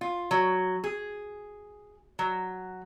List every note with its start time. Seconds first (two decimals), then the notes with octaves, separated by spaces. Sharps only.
0.01 F4
0.31 F#3
0.84 G#4
2.19 F#3